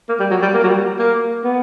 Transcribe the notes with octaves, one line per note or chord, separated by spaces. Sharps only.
A#3
G3
F#3
G3
A#3
F#3
G3
A#3
B3